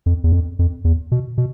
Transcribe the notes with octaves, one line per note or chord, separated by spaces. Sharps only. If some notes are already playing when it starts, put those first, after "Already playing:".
F2
E2
F2
F2
E2
B2
B2